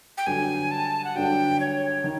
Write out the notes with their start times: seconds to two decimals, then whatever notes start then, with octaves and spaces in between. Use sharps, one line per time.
0.17 G5
0.26 G2 D3 F#3 G#5
0.71 A5
1.04 F#5
1.15 G2 D3 F#3 G5
1.60 C#5
2.04 D#3